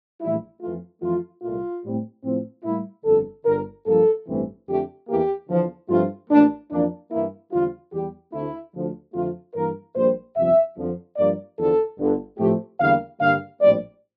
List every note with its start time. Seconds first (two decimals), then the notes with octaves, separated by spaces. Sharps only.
0.21 A#1 A2 E3 G3 E4
0.61 F2 E3 A3 F4
1.02 F2 E3 A3 F4
1.43 C2 A#2 A3 F4
1.84 A2 G3 C4
2.24 A2 F3 C4
2.64 A2 G3 A#3 E4
3.05 G1 F2 D3 A4
3.46 G1 G2 D3 A#4
3.86 G2 F3 A#3 A4
4.27 A1 G2 E3 A3 C4
4.67 F2 D3 A3 G4
5.08 E2 E3 A#3 G4
5.49 E2 D3 F3
5.89 G2 F3 A3 C4 F4
6.29 A1 A2 F3 A#3 D4
6.70 F2 E3 A#3 D4
7.11 G2 E3 A#3 E4
7.51 E2 D3 G3 C4 F4
7.92 E2 E3 G3 G4
8.33 D2 D3 A3 C4 E4
8.74 D2 D3 F3
9.14 F2 D3 A3 C4 F4
9.55 G2 E3 A#3 A#4
9.95 A#1 A#2 G3 A#3 C5
10.36 G1 F2 C3 F3 E5
10.77 F2 D3 F3
11.17 G2 F3 A#3 D5
11.58 E2 D3 F3 A4
11.98 G1 G2 D3
12.39 A2 F3 A3 C4 G4
12.80 E2 D3 G3 A#3 F5
13.20 G2 D3 G3 A#3 F5
13.61 A#1 A2 G3 C4 D5